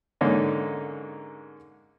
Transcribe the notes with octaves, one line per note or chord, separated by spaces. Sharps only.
G#2 D3 A#3 C#4 D#4